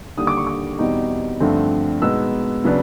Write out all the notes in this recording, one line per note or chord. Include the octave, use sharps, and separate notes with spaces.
D#2 D3 G3 D#6
D6
C#6
D6
E2 B2 G3 C4 D#4
G2 D3 F3 A3 C4
B2 G#3 B3 D#4 E6
C#3 F#3 B3 D4